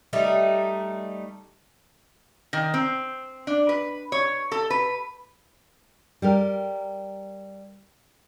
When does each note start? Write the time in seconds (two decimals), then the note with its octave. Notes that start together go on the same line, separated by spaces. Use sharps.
0.13 G3 A3 D#4
2.53 D#3
2.74 C4
3.47 D4
3.69 B4
4.12 C#5
4.52 A4
4.70 B4
6.22 G3 G4 A#4